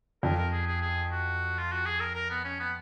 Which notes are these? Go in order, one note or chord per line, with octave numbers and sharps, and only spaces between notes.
F2 A#4
A#4
G#4
G#4
G#4
F#4
F4
F#4
G#4
A#4
A#4
B3
C#4
B3